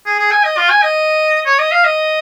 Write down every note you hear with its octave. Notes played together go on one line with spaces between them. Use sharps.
G#4
G#4
G#5
D#5
F4
G#5
D#5
C#5
D#5
F5
D#5